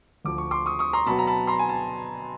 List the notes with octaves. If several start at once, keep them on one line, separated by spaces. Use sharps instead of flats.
D2 D3 F3 D6
C#6
C6 D6
C#6 D#6
C#6 D#6
A#5 C6
B2 F#3 B3 A5 B5
A#5
A5 B5
A#5 C6
G#5
A5